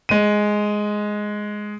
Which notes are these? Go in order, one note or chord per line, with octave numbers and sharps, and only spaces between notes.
G#3 D#7